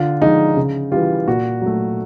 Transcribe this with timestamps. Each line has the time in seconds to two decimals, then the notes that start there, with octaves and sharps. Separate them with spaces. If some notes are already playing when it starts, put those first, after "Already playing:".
Already playing: D3 F4
0.22 F3 G#3 D#4
0.57 C#3
0.92 E3 G3 F4
1.28 A#2 F#4
1.61 F#3 A3